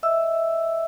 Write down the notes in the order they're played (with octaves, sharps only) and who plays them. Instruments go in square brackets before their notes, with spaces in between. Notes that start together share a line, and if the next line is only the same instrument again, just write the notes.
[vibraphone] D#5 E5 E6